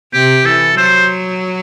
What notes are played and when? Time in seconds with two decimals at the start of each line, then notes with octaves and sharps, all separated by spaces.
0.14 C3 G4
0.45 E3 A4
0.77 F#3 C5